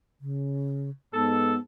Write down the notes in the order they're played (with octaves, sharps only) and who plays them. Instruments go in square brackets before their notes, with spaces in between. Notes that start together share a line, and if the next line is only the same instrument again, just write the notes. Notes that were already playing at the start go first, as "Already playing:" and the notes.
[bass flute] C#3
[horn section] G#2 A4 [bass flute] B3